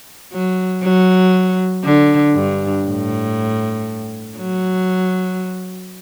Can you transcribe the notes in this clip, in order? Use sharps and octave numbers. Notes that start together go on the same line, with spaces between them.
F#3
F#3
D3
G2
A2
F#3